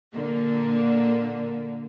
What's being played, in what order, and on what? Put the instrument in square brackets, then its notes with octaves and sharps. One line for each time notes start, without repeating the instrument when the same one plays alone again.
[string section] A#2 D3 A#3